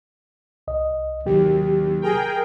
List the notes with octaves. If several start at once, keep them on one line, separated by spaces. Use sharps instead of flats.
C2 D#5
D#2 C3 F#3 G4
G#4 A#4 G5